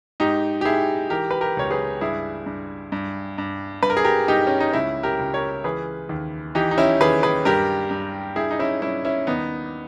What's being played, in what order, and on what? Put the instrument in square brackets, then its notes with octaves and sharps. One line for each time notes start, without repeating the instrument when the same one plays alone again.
[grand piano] G#2 D#4 G4
G4
G#2 E4 G#4
E3 G4 A#4
B4
G4 A#4
C#2 C#5
G#4 B4
G2 E4 G#4
G2
G2
G2
G2 B4
A#4
G#4
G4 A#4
G2 D#4 G4
C#4
D#4
C#2 C#4 E4
G4 A#4
C#2
A#4 C#5
E3 G#4 B4
D#2
E3 D#4 G4
D#4
C#4 E4
D#2 G#4 B4
G#4 B4
G2 G4 A#4
G2
G2 E4 G#4
D#4
C#4 E4
G2 C#4 E4
C#4 E4
D#2 B3 D#4